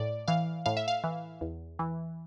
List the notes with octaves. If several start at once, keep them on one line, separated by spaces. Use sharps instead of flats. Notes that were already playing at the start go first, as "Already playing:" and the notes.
Already playing: A2 D5
E3 F5
A2 F5
E5
F5
E3
E2
E3